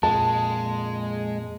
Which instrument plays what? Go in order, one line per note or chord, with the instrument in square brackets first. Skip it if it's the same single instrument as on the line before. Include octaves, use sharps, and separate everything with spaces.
[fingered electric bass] F2 A#2 [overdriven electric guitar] G#3 [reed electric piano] A5